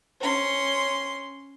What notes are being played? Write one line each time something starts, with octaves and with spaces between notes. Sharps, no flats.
C#4 C6